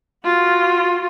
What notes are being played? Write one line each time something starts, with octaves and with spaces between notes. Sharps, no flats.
F4 F#4